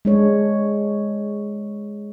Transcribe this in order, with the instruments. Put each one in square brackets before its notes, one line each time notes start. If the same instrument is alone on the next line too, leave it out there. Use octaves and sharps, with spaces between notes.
[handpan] G#3 D4 C#5